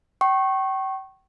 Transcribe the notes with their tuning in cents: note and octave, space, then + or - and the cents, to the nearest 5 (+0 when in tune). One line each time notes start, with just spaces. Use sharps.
G5 -35 C#6 -20